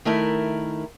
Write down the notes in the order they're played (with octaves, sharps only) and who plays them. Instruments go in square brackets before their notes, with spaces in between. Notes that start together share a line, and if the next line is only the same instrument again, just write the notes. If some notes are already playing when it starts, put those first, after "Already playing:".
[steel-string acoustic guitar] D#3 A3 E4 A#4